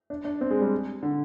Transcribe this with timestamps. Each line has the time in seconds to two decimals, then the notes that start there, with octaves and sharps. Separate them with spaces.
0.10 D4
0.25 D4
0.41 C4
0.51 G#3
0.61 G3
1.03 D3